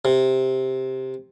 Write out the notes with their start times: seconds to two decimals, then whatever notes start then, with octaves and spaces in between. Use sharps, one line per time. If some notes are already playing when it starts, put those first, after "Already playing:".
0.05 C3